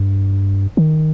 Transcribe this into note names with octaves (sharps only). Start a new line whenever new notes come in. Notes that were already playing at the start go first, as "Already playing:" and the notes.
Already playing: G2
D#3